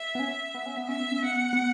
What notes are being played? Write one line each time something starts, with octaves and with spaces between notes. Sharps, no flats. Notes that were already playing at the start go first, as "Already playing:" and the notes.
Already playing: E5
B3
C#4
B3
C#4
B3
C#4 E5
B3
C#4
B3 F#5
B3